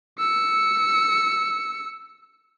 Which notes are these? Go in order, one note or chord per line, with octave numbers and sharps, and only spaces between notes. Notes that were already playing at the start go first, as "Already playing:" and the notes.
E6 C#7